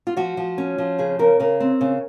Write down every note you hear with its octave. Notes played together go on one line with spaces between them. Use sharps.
F4
F3 F#4
F3
C#4
F3
C#3 G#4
C#3 A#4
C#3 A#4
C4
C#3